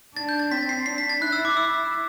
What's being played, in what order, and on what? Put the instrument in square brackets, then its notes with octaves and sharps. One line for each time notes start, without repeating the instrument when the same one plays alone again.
[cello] D4 [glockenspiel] A6
[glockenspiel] G6
A6
[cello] C4 [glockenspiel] B6
[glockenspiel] C7
[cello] D4 [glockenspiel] C7
[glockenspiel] B6
A6
[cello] E4 [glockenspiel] F#6
[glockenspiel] E6
D6
E6